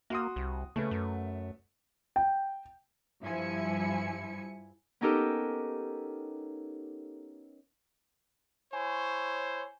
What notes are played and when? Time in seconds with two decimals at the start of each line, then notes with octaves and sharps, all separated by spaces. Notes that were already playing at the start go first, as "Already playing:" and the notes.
0.10 A#3 F#4 C6 D#6
0.36 C2
0.76 C#3 A3 B4
0.91 F#2
2.16 G5
3.22 G2 F3 E4 E5 G#5 C#7
5.01 B3 C#4 D#4 G4 A4 A#4
8.73 E4 C5 C#5 G#5